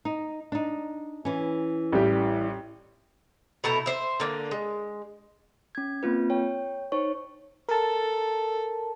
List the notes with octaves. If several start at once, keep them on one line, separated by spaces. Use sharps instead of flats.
D#4
D4 D#4
E3 C#4
A1 G3 G4
B2 A3 E4 A#5
C5 E5
D3 A#3
G#3
C#4 G#6
A#3 C4 F4 B4
C#5 G5
D#4 C5 C#5 C#6
A4 A#4 A5